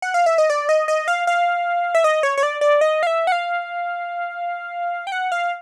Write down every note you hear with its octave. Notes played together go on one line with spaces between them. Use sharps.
F#5
F5
E5
D#5
D5
D#5
D#5
F5
F5
E5
D#5
C#5
C#5
D5
D5
D#5
F5
E5
F#5
F5
G5
F#5
F5